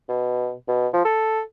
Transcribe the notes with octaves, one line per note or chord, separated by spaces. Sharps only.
B2
B2
F3
A4